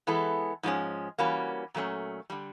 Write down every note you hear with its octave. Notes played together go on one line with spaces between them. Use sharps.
E3 G#3 B3 E4 A4
G#2 F3 G#3 C#4
E3 G3 A#3 C#4 F#4
A#2 F#3 A3 C#4
D3 G3